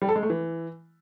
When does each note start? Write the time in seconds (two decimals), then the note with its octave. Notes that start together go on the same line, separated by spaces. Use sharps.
0.02 G3
0.09 A4
0.16 G#3
0.23 A3
0.30 E3